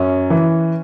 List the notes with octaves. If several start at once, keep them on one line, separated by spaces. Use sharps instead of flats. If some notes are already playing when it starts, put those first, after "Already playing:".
Already playing: F#2 C#4
E3